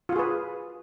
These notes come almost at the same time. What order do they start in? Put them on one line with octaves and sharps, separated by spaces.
F4 F#4 G#4 B4